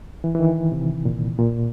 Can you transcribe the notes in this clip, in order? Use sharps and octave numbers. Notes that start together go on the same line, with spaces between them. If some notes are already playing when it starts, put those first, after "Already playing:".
E3
E3
D#3
C3
A#2
A#2